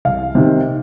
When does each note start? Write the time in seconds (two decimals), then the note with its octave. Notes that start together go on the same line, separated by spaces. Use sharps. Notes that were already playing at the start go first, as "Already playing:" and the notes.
0.05 C2 F5
0.35 C3 D#3